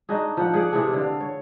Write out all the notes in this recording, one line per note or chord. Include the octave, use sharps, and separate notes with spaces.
D4 D#4 F#4 G#4
F3 F#5
G#4 D5 F#5
C3 E3 G#4 A4
D3 F5
C#5